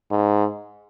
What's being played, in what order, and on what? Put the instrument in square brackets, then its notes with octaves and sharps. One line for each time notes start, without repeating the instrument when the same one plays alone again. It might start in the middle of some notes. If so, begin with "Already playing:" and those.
[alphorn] G#2